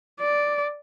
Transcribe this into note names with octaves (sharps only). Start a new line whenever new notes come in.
D5